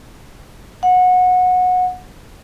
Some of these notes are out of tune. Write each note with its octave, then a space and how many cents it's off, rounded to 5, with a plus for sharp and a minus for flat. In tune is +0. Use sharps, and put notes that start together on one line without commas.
F#5 -20